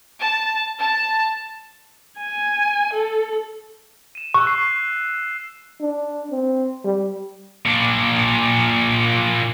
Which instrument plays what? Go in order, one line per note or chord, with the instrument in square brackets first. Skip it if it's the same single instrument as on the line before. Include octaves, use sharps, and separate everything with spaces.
[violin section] A5
A5
[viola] G#5
A4
[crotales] D#7 E7
[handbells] C#6 [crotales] E6 F#6
[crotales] C7 E7
[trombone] D4
C4
G3
[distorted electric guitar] A#2 D4